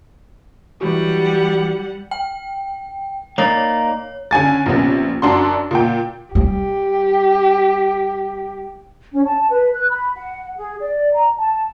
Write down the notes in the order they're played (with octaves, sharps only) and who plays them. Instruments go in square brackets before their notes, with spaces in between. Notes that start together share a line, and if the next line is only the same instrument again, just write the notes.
[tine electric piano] E3 F#3 F#4 [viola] G3 F#5
[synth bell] G5
[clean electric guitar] A#3 D#4 D5 [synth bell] C#5
[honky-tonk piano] D3 C#4 G#5 A6
A#1 C3 B3 C#4
F#2 D4 F#4 C6
A#2 G5
[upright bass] G3 [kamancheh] G4
[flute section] C#4
A5
B4
F#6
B5
F#5
G#4
D5
A#5
A5